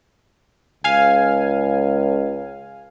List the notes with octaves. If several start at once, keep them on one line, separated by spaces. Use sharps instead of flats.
C#2 F5 G#5